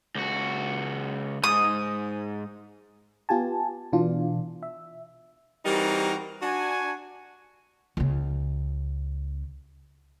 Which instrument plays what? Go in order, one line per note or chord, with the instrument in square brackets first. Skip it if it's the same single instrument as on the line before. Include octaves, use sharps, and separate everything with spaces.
[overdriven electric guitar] C#2 F#4
[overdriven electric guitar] G#2 [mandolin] D#6
[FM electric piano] B3 F4 G4 G#5 A5
B2 E3 D4 F4
E5
[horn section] E3 G3 C4 D#4 F#4 A#4
D4 F#4 G#5
[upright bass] C#2 C#3